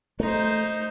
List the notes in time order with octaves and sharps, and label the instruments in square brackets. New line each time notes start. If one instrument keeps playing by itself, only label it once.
[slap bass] A3 [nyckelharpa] D#4 C5